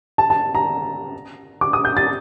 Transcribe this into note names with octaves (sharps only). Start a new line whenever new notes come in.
A5
A5
A#5
D6
D#6
G6
A6